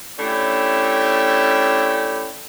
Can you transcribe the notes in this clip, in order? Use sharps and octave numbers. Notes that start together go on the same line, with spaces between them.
A3 C#4 D4 E4 G4